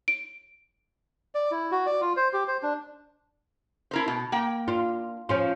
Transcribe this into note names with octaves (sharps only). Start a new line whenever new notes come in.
D7
D5
E4
F#4
D5
F4
C5
G4
C5
D4
E4 A#4 C5
B2
A#3 G5
D4 F4
F3 C#4 F4